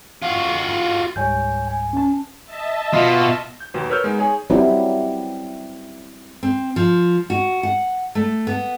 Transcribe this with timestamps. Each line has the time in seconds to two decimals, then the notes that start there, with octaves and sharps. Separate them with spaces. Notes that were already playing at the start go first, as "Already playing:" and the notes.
0.23 F4 F#4
1.16 C#2 G#2 G3 C#5 G#5 G6
1.67 G#5
1.93 C#4 A5
2.45 D#5 E5 A5
2.93 B2 F4
3.60 G6
3.74 D#2 B2 F#3 C5
3.89 A#4 B4 C#5 E6 F6 G6
4.04 G#3 B3 D#4
4.19 G#4 C#5 G#5
4.50 F#3 G3 C4 E4
6.43 C4
6.76 F3
7.30 F#4
7.63 F#5
8.15 A3
8.47 B3